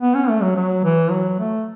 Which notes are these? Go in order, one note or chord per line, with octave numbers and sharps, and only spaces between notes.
B3
C#4
A3
F#3
F#3
E3
F#3
A3